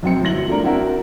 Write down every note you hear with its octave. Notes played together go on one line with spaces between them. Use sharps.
B1 F#2 C4 C#7
G1 F#3 E4 A#6 F#7
F3 A3 D4 A#4
C4 D4 E4 F#4 A#4